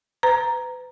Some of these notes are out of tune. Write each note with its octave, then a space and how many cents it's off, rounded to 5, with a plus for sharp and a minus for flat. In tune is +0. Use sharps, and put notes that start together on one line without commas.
B4 +35 A#5 +0